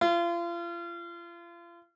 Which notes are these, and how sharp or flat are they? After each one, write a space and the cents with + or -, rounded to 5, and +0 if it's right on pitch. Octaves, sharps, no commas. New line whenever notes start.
F4 -35